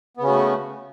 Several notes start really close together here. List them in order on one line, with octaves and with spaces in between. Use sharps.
B3 C#3 C#4 F#4 A3